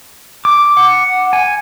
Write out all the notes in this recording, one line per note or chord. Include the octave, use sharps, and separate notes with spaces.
D6
F#5
G#5